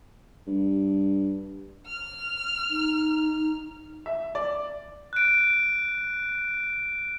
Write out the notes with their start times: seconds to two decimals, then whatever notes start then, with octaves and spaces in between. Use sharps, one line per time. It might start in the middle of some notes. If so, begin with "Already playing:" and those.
0.47 G2
1.86 F6
2.70 D#4
4.06 E5
4.35 D5
5.13 F#6 D7